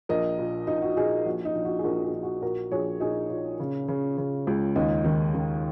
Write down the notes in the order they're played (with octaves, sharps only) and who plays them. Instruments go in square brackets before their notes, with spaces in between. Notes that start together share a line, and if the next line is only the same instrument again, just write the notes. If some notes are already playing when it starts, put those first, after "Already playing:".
[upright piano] A#1 A#4 D#5
A#2
A#2 D#4
F#4
A#2 D#4 G#4
A#1 F#4
D#4
A#1
F#4
G#4
A#1 F#4 A#4
D#4 G#4
A#1
F#4
A#2 F#4 A#4
A#1 G#4 C#5
A#2 D#4 G#4
A#2
C#3
C#3
C#3
C#2
D#2 D#4
D#3
D#3